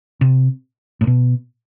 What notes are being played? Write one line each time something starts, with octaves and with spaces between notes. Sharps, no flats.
C3
A2
B2